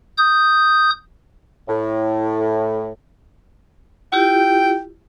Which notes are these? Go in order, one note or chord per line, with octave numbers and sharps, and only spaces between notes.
D#6 G6
A2
E4 F4 G4 G5